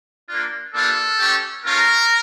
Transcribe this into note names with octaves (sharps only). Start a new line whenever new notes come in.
A#3 D4 F4
G3 A#3 D4 F4 A4
A3 C#4 G4
A3 C#4 F4 A#4